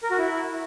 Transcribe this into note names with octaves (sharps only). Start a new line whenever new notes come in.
A#4
F#4
E4